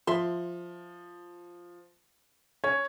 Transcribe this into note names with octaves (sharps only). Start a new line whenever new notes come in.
F3 E5 C6
C#4 C#5